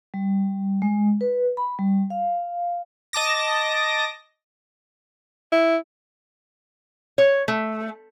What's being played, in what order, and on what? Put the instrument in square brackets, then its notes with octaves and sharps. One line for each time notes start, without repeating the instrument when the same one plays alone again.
[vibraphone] G3
G#3
B4
B5
G3
F5
[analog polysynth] D#5 A5 D6 A#6
[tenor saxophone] E4
[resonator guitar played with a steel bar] C#5
A3